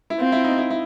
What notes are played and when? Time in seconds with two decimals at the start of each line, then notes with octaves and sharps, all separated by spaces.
0.10 E4
0.19 C4 F4
0.32 E4
0.44 D#4
0.58 E4
0.70 E4